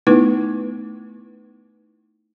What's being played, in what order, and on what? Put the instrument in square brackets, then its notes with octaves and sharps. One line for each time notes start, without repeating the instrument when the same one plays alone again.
[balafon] A3 B3 D#4 E4 B4